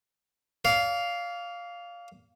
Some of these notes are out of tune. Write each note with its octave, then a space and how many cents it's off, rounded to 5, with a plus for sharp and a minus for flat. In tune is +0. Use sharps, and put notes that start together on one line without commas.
D5 -40 F5 +0